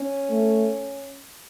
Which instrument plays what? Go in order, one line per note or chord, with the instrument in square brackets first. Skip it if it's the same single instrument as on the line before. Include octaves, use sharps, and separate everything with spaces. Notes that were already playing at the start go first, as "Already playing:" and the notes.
Already playing: [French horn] C#4
[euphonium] A3